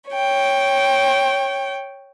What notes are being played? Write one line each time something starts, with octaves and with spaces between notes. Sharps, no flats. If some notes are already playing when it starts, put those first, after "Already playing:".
C#5 G5